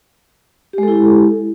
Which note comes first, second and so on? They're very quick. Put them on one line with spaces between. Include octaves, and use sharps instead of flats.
G4 G#3 A4 E4